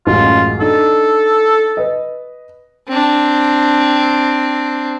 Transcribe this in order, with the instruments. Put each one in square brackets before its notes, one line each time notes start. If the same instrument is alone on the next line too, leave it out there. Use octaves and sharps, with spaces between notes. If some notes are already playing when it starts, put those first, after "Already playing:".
[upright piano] A1 F#2 G#3 [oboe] F4
[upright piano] D4 D#4 [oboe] A4
[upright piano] B4 D#5
[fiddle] C4 D4